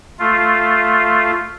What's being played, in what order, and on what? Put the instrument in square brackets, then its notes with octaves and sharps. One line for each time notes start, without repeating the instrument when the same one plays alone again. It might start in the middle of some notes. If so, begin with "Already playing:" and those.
[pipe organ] A3 F4